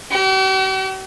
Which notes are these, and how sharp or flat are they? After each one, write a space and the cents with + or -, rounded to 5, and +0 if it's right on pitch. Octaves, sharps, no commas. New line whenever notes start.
G4 -45